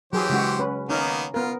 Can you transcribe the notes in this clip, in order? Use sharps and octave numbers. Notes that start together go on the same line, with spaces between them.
E3 F#3 G4 G#4 C5
C#3 G#3 F#4
C#4 B4
D#3 A#3 B3 C#4 D#4
B3 F4 A#4